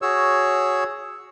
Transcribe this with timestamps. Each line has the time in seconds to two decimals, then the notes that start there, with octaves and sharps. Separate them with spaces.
0.02 F#4 G#4 C#5 E6